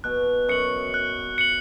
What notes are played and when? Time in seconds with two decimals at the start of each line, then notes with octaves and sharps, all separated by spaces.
0.04 B2 F#6
0.48 F#2 C#7 F#7
0.94 F#6
1.38 C#7 F#7